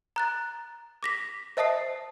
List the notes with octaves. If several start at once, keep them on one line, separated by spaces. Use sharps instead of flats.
A#5 F#6 A6
D6 A#6 B6
C5 D#5 E5 A5 D#6 C7